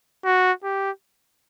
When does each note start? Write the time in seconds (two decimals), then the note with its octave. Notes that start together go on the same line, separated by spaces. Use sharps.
0.25 F#4
0.63 G4